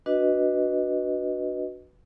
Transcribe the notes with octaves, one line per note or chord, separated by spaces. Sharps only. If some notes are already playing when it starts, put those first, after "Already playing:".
D4 F#4 B4 D#5